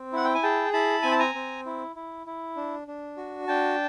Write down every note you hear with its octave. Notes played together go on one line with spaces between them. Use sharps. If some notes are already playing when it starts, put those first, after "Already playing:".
Already playing: C4
E4 F#5
G5
G#5
G#4 G5 A5
E4 A5 B5
C4 G#5
A5
G#5 A#5
C4
E4
E4
E4
D4
D4
F#4
D4 G5 A5